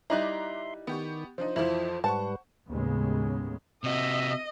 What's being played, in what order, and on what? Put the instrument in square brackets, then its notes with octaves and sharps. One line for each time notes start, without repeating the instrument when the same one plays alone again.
[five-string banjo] G3 D#4 E4 [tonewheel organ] E5 C6 [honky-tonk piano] A#5 D6 F#6
[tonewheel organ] D#3 [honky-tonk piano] B3 G4 C#6
[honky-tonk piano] F3 D4 D#4 [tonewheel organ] C5
[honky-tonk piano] F2 E3 F3 [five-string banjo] E4
[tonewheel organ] G#2 G3 B4 [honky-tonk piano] C5 F#5 C#6 [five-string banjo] A5
[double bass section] D#2 A2 C#3 G#3 B3
[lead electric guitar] C3 F#4 [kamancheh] D#5 [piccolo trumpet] E5